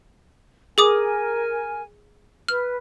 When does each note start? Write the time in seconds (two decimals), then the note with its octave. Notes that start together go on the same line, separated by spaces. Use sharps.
0.78 G#4 A#4 G#5 D6 D#6
2.49 B4 F6